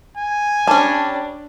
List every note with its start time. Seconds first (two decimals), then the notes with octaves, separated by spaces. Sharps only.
0.18 G#5
0.67 G3 C#4 D4 A5